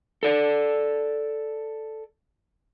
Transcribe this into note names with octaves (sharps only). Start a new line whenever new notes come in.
A4 D5